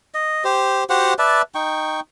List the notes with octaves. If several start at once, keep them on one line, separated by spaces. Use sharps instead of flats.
D#5
G4 C5
F#4 G4 C5 F#5
B4 D5 E5 A5
D#4 G5 C#6